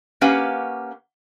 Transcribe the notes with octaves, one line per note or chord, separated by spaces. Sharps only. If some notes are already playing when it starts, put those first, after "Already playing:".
A#3 C#4 G4 B4 F5 F#5